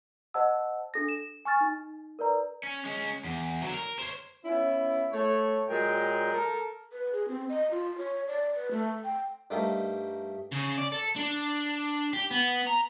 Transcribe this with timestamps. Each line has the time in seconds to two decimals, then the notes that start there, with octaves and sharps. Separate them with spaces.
0.34 C5 D#5 F#5 A5 E6
0.94 D4 A4 A#6
1.09 E7
1.45 G#5 C#6 F6 A6
1.61 D#4
2.19 A#4 B4 D5 A#5
2.63 C#4
2.85 G#3 C#4
3.24 E2
3.62 D3 F#3
3.73 A#4
3.99 C5 C#5
4.45 B3 C#4 E4
5.11 A3 C#5
5.68 A#2 F#3 G#3 A#4 G5
6.32 A4 A#4
6.92 B4
7.13 G#4
7.28 C4
7.49 D#5
7.71 F4
7.98 C#5
8.28 D5
8.55 B4
8.71 A3
9.04 G5
9.50 G2 G3 A3 A#3 D#4
10.52 C#3
10.78 D5
10.92 A4
11.16 D4
12.13 G4
12.31 B3
12.67 A#5